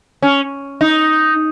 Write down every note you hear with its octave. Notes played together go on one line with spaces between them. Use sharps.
C#4
D#4